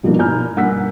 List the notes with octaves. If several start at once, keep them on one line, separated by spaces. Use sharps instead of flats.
G2 B2 F3 A#3 D#4 E4
G#5 A#5 B5 F6 G6
G2 A#3 F#5 E6 B6